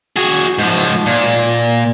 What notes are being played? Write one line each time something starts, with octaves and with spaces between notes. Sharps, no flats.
F#4 G#4
G#2 F3
A#2